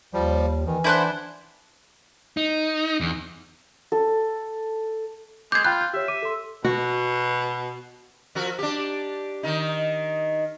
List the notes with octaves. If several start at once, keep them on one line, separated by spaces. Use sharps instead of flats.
D#2 F3 G3
D#3 E3
D4 E4 C5 F#5
D#4
E2
A4
G#3 D6 G6 G#6 C7
F4 G5 B5 F#6 G6
G6
G4 C#5 E5
D6 D#7
A4 C6
B2 F#4
F3 F#4 A#4
D4 G4
D#3 D#4